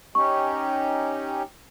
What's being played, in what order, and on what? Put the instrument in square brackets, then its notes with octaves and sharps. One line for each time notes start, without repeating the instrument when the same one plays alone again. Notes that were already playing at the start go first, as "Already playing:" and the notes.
[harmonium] C#4 D#4 G4 [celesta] C#6